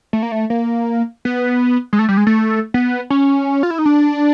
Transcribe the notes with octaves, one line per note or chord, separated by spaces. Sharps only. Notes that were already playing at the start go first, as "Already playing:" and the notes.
A3
A#3
A3
A#3
B3
G#3
A3
G3
G#3
A3
B3
C#4
F4
E4
D#4
D4